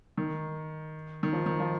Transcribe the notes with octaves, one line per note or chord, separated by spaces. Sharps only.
D#3
D#3
F3
D#3
F3